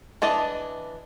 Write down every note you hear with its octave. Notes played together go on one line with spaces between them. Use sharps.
E3 D4 D#5 A5